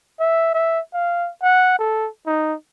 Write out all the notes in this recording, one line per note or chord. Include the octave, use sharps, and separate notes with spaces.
E5
E5
F5
F#5
A4
D#4